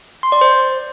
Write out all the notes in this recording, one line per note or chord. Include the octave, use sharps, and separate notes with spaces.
C6
D5
C5